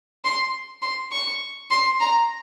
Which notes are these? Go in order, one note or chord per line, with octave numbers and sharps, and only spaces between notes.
C6
C6
C#6
C6
A#5